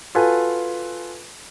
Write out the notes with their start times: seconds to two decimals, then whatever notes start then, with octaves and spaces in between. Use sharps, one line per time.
0.15 F4 F#4 A4 B4 G#5